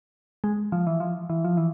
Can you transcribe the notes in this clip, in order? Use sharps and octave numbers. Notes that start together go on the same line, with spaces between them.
G#3
F3
E3
F3
E3
F3
E3